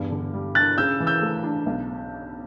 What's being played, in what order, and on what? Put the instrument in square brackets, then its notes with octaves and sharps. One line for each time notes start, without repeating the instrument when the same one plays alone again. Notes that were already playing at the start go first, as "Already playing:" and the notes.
Already playing: [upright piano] E2 G2
D3
G3
[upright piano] D4 [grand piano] F#6 A6
[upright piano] C#3 [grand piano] E6 G6
[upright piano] E3
[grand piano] E6 G6
[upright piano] A3
D4
B1